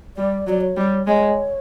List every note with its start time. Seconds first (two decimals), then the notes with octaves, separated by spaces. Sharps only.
0.17 G3 D5
0.47 F#3 D5
0.61 C#5
0.76 G3
1.06 G#3 C#5